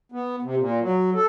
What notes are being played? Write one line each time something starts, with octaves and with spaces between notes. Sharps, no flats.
B3
C3
A#2
F#3
A4